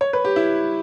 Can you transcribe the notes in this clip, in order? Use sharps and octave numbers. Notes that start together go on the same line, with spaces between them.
C#5
B4
G4
E4